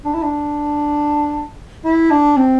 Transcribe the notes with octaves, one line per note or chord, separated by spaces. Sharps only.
D4
E4
D4
E4
D4
C4